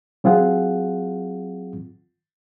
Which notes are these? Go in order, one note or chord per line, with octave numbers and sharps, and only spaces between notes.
F#3 C4 F4 G#4 F#5